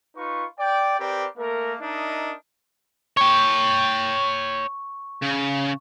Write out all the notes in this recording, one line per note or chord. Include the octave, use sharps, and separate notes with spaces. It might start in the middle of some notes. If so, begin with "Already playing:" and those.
D#4 F4 B4 C#6
D5 G5
C4 G4 A#4 B4 D5
A3 A#3 A#4
D4 D#4 A#4 D#5 E5
C#5 G5 C#6
C#3